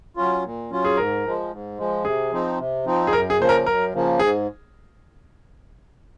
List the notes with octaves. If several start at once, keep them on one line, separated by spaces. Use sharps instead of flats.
F#3 C#4 F4
A#2
F#3 C#4 F4
G#4
G#2 A#4
F3 G#3
G#2
F3 G#3
C3 G#4
F3 C4 D#4
C3
F3 C4 D#4
G#4
F#2 A#4
G#4
C#3 F3 A#3 C5
A#4
F#2 A#4
C#3 F3 A#3
G#2 G#4